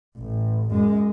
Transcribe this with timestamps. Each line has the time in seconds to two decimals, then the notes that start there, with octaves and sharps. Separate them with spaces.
0.18 A1
0.71 F#2 G#3